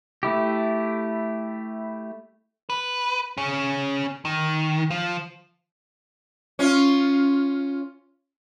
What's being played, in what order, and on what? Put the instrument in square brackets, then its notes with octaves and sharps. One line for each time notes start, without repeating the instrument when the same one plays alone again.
[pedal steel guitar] A3 E4 G4
[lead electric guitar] B4
C#4 G#4
D#3
F3
[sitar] C#4 F4